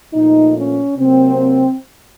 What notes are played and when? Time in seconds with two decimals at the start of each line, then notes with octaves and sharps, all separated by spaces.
0.14 A#2 F3 A3 D#4
0.56 C#4
0.98 C3 F#3 A#3 C4